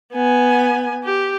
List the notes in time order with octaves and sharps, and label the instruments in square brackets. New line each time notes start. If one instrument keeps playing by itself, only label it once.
[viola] B3 G#5
G4